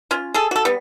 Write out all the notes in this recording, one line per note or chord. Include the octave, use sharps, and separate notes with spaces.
C#4 F4
G#4 A4
F#4 A4
G3 B3